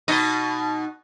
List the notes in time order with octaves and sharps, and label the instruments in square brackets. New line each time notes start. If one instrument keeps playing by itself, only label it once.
[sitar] B2 D#4 D#5